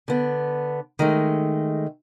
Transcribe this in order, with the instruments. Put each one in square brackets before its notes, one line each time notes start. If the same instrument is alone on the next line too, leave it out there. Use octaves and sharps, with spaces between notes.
[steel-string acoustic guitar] D3 B3
D#3 G#3 A3